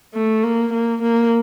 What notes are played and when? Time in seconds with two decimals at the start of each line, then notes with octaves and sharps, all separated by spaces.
0.14 A3
0.43 A#3
0.73 A#3
1.02 A#3